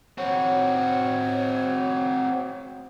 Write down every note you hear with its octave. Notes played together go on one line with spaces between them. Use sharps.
C4 F#4 C#5